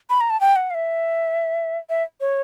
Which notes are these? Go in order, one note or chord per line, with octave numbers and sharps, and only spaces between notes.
B5
A#5
A5
G5
F#5
F5
E5
E5
C#5